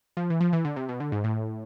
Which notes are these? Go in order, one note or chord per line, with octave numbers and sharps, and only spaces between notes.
F3
E3
F3
E3
D3
C3
B2
D3
G#2
A2